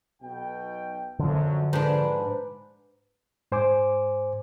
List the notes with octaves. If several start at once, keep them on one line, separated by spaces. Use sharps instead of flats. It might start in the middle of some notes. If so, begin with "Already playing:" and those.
B1 B2 G5
F#2 D3 F3
G#2 D4 B4
G#2 C5 G#5 D6